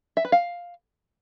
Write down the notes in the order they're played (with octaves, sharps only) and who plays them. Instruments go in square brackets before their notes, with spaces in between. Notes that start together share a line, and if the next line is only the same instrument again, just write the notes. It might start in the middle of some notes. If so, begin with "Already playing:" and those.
[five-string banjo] E5
B4
F5